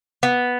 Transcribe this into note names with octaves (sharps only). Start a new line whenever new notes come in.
B3